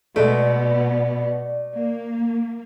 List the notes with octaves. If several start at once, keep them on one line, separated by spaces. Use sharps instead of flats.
B2 G#3 A3 B3 D5
A#3